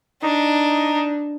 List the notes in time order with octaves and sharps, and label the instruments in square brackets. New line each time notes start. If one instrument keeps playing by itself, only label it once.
[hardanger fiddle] D4 [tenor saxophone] D#4